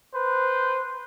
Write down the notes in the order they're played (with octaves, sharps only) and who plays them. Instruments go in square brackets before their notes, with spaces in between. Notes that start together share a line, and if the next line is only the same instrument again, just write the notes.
[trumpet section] B4 C5